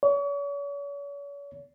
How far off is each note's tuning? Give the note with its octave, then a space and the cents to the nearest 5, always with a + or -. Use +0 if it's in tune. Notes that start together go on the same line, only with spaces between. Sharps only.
C#5 +40